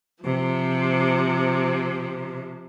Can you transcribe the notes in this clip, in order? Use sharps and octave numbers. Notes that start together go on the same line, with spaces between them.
C3 F3